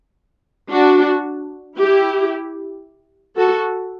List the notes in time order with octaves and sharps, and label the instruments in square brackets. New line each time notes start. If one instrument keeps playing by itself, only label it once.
[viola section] D4 F#4
E4 G4
F#4 A4